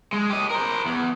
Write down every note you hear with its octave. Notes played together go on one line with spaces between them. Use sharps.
G#3
G4 D#5
A#4 C5
E2